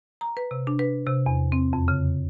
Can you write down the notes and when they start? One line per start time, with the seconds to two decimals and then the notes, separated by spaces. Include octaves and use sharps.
0.21 A#5
0.37 B4
0.51 C3
0.67 D4
0.79 B4
1.06 C3
1.26 E2
1.52 C4
1.73 F2
1.88 C#3